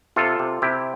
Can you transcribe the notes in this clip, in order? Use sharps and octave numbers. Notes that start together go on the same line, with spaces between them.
C3 F4 A4
C3
C3 E4 G4